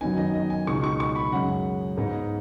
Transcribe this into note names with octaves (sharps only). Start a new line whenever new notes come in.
F#2 D#3 F#3 B3 D#4 G#5
D#5
D#5
G#5
C#2 B2 G#3 D#4 C#6
C#6
C#6
B5
F#2 C#3 G#3 F#5
G#2 G#3 B3 D#4